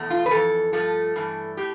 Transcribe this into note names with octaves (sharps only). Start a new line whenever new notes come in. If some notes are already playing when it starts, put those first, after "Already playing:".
Already playing: E2 B2 A3
F4
B4
F2 E3 A4
G2 F3 A3 A4
G2 E3 A3
A2 G4